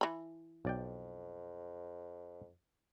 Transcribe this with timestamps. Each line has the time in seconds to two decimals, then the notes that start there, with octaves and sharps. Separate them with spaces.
0.01 E3 B5
0.65 B1 F2 D5 G5